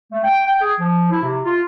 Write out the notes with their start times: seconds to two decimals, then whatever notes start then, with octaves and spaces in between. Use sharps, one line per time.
0.12 A3
0.24 G5
0.48 G5
0.61 G#4
0.80 F3
1.11 E4
1.23 C3
1.45 F4